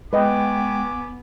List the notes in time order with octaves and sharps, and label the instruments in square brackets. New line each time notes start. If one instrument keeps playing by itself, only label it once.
[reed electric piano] G#3 G5 [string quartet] B3 [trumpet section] F#4 G#5 D6 [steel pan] B4 D#5